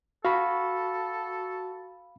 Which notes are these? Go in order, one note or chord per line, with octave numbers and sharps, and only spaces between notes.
F#4 A4 F5 B5